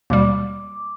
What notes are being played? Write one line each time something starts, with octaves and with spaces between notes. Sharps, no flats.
D#2 B2 G3 D6